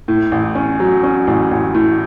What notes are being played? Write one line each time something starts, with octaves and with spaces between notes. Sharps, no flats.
A2
A1
C#4
F#3
C#4
A1
A1
A2